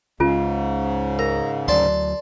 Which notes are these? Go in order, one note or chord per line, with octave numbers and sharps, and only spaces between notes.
C#2 G#2 C#3 C#4 F4 G#5
A#4 A#5
D2 F#3 D5 A5 C6